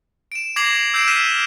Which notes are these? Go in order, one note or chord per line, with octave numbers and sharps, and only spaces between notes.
D7 E7
D6 G#6 A#6 C7 F7 F#7
E6 G6 C7 D7 E7
F6 B6 D#7 E7